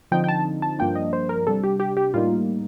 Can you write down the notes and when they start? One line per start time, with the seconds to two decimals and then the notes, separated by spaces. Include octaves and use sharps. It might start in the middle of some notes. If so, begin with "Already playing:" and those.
0.12 D3 F3 C4 D#4 G5
0.24 G5
0.28 A5
0.62 A5
0.79 G2 F3 A#3 D4 G5
0.95 D#5
1.13 C5
1.29 A#4
1.47 C3 G3 D4 A4
1.63 G4
1.80 G4
1.97 G4
2.14 A2 G3 A#3 D#4 F4